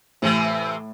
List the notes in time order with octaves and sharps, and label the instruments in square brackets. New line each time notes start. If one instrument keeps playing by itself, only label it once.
[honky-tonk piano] A2 [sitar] C3 E3 C4